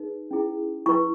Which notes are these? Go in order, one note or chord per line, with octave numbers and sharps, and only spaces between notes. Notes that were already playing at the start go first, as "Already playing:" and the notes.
Already playing: D#4 G#4 B4
C#4 E4 G#4
E4 B4 C#6